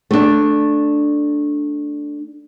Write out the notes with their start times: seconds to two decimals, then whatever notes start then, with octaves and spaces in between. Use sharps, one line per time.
0.11 A3 D4